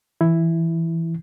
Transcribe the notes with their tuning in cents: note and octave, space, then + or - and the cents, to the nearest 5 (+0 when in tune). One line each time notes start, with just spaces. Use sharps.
E3 +0 E4 +0